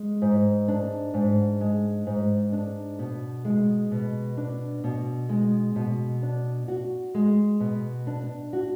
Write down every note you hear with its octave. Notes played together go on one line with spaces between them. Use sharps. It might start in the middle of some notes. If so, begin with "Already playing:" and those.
Already playing: G#3
G#2
D4
G#2
G#3
G#2
D4
B2
G#3
B2
D4
B2
G#3
B2
D4
F#4
G#3
B2
D4
F#4